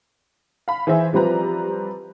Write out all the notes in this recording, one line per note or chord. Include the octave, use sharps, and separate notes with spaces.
F5 B5
E3 G#4 C5 E5
F3 G3 C4 B4 A#5